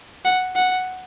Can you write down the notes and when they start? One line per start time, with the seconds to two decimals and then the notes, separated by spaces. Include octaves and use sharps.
0.25 F#5
0.55 F#5